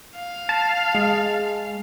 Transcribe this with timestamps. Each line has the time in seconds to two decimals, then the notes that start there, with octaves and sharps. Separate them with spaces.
0.16 F5
0.49 A5
0.95 G#3